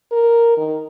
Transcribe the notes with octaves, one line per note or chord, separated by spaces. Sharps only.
A#4
D#3